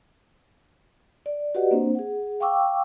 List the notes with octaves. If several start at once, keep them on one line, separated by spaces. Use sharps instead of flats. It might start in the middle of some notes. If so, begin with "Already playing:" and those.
D5
F#4 G4 B4 D5 D#5 F#5
A#3 C4 D4 C5
G#4 F#5
F5 G5 C#6 D6 E6